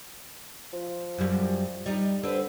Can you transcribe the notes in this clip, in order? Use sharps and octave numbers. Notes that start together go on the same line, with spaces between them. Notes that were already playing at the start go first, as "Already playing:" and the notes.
F3
F#2 G3
G3 D#4
D3 C4 B4